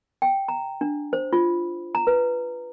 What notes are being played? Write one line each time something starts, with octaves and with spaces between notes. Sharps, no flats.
G5
A#5
D4
C5
F4
A#5
B4